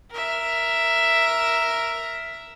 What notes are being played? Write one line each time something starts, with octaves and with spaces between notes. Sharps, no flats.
A#4 E5